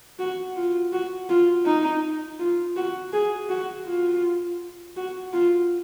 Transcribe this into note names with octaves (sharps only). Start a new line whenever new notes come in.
F#4
F4
F#4
F4
D#4
F4
F#4
G#4
F#4
F4
F#4
F4